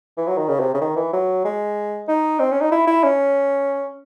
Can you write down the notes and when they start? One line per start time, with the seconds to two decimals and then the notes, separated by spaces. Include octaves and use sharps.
0.17 E3
0.28 F#3
0.38 D#3
0.48 C#3
0.60 C3
0.74 C#3
0.81 D#3
0.96 E3
1.13 F#3
1.45 G#3
2.08 D#4
2.39 C4
2.51 C#4
2.61 D#4
2.72 E4
2.87 E4
3.04 C#4